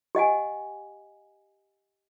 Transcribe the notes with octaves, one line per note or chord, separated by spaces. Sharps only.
G4 D#5 F#5 G#5